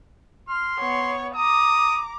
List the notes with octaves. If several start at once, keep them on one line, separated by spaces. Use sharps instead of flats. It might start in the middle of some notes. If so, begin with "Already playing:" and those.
C6 F6
B3 C#5
A#5 D6 D#6